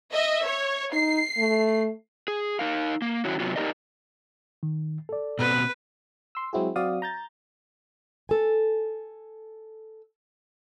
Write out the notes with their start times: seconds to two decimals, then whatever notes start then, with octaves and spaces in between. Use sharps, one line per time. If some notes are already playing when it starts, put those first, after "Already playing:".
0.11 D#5 E5
0.43 C#5
0.93 D#4 C7
1.38 A3
2.28 G#4
2.59 D#4 A#4 F5
3.02 A#3
3.25 D#3 F#3 C#4 E4 F#4
3.40 C3 F#3 B3 F4 F#4
3.56 D#4 F4 G4 A#4 D5 D#5
4.63 D#3
5.09 A4 D5
5.39 B2 B3 C4 B4
6.35 C6 E6
6.53 F#3 G#3 C4 E4 F#4 G#4
6.76 F#3 C4 F#4 D5 F5 D#6
7.02 A#5 G6 A6
8.29 A4 G#5